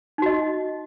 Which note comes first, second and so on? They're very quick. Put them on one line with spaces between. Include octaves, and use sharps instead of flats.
D#4 F#4 D#5